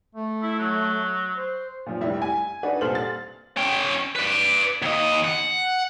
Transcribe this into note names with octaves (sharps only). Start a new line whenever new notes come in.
A3
E4
F#3
C5
A#2 F3
F1 G3 E4
G#5
D4 D#4 F#4 A4 B4 D5
C2 A#2 A4 C5 F6 F#7
A6
C#4 G5
B4 D5
D#2 D#5
F#5